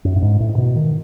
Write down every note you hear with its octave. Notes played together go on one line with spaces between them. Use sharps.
F#2
A2
G#2
A2
B2
D#3